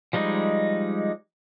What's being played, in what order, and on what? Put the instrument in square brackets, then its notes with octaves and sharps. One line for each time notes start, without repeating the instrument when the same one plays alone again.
[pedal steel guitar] F3 G3 G#3 D#4